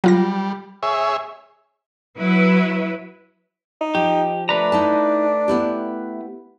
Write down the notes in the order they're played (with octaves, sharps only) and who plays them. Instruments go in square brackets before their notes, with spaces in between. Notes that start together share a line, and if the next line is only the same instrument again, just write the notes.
[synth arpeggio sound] F#3 F4 A#6 [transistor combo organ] G3
[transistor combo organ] G#4 C#5 E5
[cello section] F#3 E4 B4
[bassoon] D#4
[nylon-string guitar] F3 [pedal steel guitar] G4
[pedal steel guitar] A3 B4 A#5 [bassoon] D4
[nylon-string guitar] D#4 E4 A5
B3 E4 G4